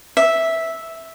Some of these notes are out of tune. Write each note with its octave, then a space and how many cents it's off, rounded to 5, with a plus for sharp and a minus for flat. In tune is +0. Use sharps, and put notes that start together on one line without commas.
E5 -5